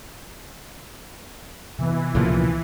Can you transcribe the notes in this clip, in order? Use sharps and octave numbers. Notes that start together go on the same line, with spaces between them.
C3 E3 B3
C#2 A#2 F3